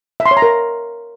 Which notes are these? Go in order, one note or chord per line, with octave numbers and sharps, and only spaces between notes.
E5
C6
C#5
A#5
A#4